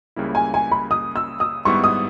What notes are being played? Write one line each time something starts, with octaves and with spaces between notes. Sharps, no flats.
C#2 C#3 G3 A#3 E4
G#5
G#5
B5
D#6
E6
D#6
G#1 G#2 G3 B3 E4 C#6
D#6